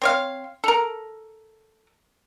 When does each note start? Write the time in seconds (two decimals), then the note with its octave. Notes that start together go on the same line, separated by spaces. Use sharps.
0.02 C4 C#5 F5
0.64 A4 A#4